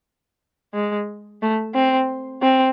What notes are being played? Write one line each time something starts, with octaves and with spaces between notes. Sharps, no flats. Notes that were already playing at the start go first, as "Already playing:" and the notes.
G#3
A3
C4
C4